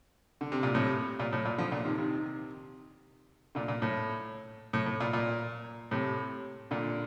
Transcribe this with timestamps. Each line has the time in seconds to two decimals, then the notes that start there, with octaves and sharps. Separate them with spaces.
0.41 D3
0.52 C3
0.63 A#2
0.75 A2 C3
1.20 A#2
1.33 A2
1.45 A#2
1.58 D3 F3
1.71 A#2 D3
1.84 C3 D#3
1.98 C3 D#3
3.55 A#2 D3
3.68 A#2
3.82 A2
4.73 A2
4.86 A2
5.00 A#2
5.13 A#2
5.91 A2 C3
6.71 A#2 D3